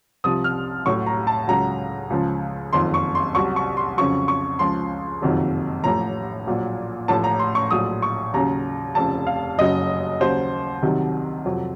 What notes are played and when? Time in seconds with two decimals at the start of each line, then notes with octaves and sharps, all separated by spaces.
0.24 C2 C3 F3 D#6
0.44 F6
0.86 A1 A2 F#3 C#6
1.06 A#5
1.27 A5
1.48 C#2 C#3 F#3 A#5
2.10 C#2 C#3 F3
2.73 F#1 F2 D#3 C6
2.94 C#6
3.15 C6
3.35 C2 C3 F#3 C#6
3.56 C#6
3.77 C6
3.97 F2 C#3 F#3 C#6
4.28 C#6
4.59 C#2 C#3 F3 C6
5.21 F#1 F2 C3 D#3 F#3
5.84 A1 A2 F3 A#5
6.47 A#1 A#2 F#3
7.08 A1 A2 F3 A5
7.24 A#5
7.39 C6
7.55 C#6
7.71 A#1 A2 F#3 D#6
8.02 C#6
8.34 D#2 C#3 F#3 A#5
8.95 F1 F2 C#3 A5
9.27 F5
9.58 F#1 F#2 C#3 F#3 D#5
10.20 D#2 C#3 F#3 C5
10.82 C2 C3 D#3 F#3
11.45 F2 C3 F#3